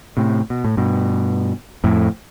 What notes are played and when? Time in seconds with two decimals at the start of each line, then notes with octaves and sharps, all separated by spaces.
0.17 A2 C3
0.50 B2
0.64 A2
0.77 G2 B2
1.84 F2 A2